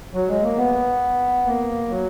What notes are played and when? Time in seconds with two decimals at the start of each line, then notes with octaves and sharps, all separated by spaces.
0.14 F#3
0.28 G#3
0.43 A#3
0.57 B3
1.46 A#3
1.89 F#3